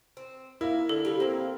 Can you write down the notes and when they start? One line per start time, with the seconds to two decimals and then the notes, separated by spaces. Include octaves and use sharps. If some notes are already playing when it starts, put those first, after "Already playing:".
0.17 C4
0.61 A#3 E4 A#4
0.89 D3 A4
1.05 G3 G4 F5
1.20 A#3 C4 F5